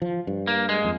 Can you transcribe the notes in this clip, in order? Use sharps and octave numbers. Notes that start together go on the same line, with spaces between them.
F3
G2
A#3
G#3
F2